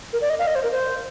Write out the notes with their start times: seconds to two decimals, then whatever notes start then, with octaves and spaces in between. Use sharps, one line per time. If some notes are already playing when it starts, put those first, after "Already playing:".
0.13 A#4
0.22 D5
0.30 D#5
0.39 F5
0.47 D#5
0.55 C5
0.63 A#4
0.72 C5